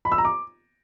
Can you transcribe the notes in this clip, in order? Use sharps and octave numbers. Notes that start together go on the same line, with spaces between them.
B5
E6
A#5
D6